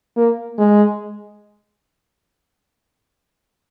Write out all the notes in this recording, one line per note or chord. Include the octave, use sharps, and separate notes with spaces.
A#3
G#3